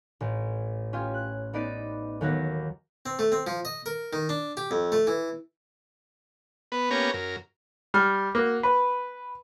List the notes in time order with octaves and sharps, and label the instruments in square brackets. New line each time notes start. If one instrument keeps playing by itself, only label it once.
[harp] A1
C#4 F4 G4
F#6
B3 D#4 D5 B5 D#6 D7
D#2 E3 F#3 B3 F#4 A#6
[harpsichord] C4
A3
C4
F3
D#5
A#4
D#3
D4
G4
F2
A3
E3
[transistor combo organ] B3 B4
A#3 B3 C#4 G4 C#5 A#5
F#2 A#4
[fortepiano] G3 F6
A#3 F#4
B4